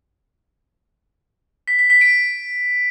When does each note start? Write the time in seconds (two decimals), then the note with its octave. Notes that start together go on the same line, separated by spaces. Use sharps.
1.68 B6
1.79 B6
1.90 B6
2.01 D7